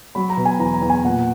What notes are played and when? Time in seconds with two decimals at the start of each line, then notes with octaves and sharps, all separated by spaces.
0.15 F#3 B5
0.30 A#5
0.37 B2
0.45 G#5
0.59 E2 A#5
0.74 A#5
0.82 E2
0.90 G#5
1.04 A#2 F#5